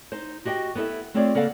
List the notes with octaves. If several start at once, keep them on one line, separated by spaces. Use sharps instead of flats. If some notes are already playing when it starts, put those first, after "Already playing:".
D#4 C5
F#4 G4 D#5 G5
B3 E4 A4 E5
A3 C4 F4 G#4 C#5 D5
C#3 A#3 A4 D5 F5 F#5